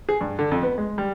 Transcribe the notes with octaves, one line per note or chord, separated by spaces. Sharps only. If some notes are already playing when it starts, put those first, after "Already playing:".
G#4
G2
D3
F2
B3
G#3
G3